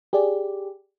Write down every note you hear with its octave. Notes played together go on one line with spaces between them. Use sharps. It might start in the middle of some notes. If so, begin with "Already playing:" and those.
G4 G#4 D5